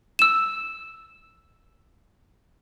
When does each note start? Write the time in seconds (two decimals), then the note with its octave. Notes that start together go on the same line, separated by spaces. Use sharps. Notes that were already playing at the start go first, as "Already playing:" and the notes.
0.19 E6 E7